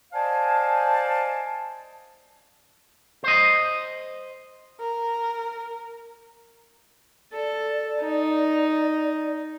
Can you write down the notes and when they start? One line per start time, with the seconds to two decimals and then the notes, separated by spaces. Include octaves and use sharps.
0.13 C5 D5 D#5 F5 G#5 A5
3.24 C5 D#5
4.80 A#4
7.33 A4 D5
8.01 D#4